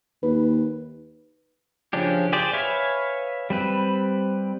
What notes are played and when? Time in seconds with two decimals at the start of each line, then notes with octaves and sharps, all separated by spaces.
0.23 D#2 B4
1.93 C#3 F3 C#4 D4 G4
2.33 G4 G#4 C5 D5
2.53 B4 C#5 E5 F5 G#5
3.50 G3 C4 B4